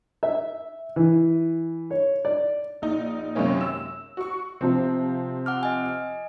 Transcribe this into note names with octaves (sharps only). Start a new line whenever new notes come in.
E5
E3
C#5
D5
A#1 D#4
F#2 C3 D#3 G#3 A#3 C#4
E6
F#4 C#6
C3 F3 C4
F#5 D6 F6
D#5 G#5